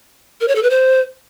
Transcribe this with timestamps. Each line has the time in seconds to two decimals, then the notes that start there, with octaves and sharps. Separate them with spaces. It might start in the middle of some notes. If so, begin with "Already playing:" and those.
0.41 A#4
0.48 C#5
0.55 A4
0.63 B4
0.70 C5